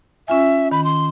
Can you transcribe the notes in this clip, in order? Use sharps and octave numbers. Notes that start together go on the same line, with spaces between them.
C#4 F4 E5 G#5
D#3 B5
C6